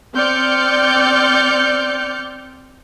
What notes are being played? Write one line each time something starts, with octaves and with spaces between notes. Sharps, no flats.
C4 D5 F6 G6 C#7